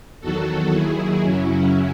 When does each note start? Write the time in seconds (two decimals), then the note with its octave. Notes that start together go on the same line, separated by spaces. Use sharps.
0.21 E2 D#3 F#3 F#4 A4
0.72 D#2 D#3 F#3 E4 G#4
1.23 F#2 C#3 F#3 C#4 E4